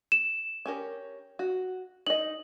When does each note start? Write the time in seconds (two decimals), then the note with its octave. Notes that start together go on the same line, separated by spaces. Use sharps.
0.12 E7
0.66 C#4 G4 A#4
1.39 F#4
2.07 D#4 D#5 F#7